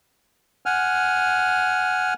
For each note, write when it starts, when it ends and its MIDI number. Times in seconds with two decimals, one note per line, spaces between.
0.66 2.14 78
0.66 2.14 80
0.66 2.14 89